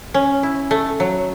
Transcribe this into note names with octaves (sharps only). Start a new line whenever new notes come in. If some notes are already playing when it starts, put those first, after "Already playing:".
C#4
E4
A3
F#3